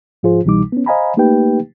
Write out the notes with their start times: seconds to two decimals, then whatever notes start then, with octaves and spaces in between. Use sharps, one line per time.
0.23 G#2 F3 F4 G#4 C5
0.45 C2 B2 E3 G3 D#4 D6
0.72 B3 C#4
0.86 C5 D#5 F5 G#5 A#5 B5
1.17 A3 A#3 D#4 G4 B4 G5